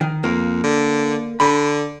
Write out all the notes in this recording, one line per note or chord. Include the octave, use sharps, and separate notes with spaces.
D#3
F2 A#3
D3
D3 B5